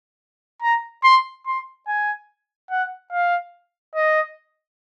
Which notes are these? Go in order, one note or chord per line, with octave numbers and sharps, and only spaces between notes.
A#5
C6
C6
G#5
F#5
F5
D#5